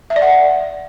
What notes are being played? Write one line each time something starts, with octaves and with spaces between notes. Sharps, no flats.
E5
D5
F#5